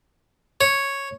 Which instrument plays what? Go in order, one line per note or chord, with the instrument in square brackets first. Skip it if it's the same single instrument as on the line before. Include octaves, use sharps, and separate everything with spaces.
[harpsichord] C#5